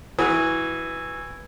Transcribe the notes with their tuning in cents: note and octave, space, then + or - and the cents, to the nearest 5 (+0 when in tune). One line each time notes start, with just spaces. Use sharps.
E3 +0 F#4 -5 D#6 +40